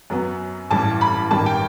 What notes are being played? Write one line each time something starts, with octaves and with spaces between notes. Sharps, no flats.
F#2 F#3 B3
A1 G2 E3 A5
B5
A1 G2 D#3 G3 A5
G5